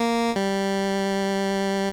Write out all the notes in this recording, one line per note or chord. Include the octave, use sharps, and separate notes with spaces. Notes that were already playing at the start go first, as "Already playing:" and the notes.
Already playing: A#3
G3